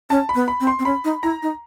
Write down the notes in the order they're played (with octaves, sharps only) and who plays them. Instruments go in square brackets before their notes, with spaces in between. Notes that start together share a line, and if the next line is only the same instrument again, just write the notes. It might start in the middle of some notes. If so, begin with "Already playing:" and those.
[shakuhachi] C#4 [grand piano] A5
[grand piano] B5
[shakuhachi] B3
[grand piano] B5
[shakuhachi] C4
[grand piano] C6
[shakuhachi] C4
[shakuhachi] C#4 [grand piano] B5
[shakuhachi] D#4
[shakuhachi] E4 [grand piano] A#5
[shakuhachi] D#4